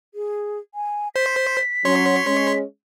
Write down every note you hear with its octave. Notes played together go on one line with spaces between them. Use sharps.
G#4
G#5
C5 B6
F#3 C#4 C#5 C6
G#3 C#4